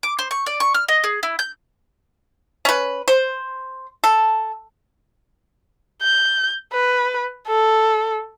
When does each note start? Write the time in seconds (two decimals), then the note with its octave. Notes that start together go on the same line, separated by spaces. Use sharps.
0.03 D6
0.19 C5
0.31 C#6
0.46 D5
0.60 C#6
0.74 F6
0.88 D#5
1.04 G#4
1.23 E4
1.39 G6
2.65 C#4 B4
3.08 C5
4.04 A4
6.02 G6
6.73 B4
7.47 A4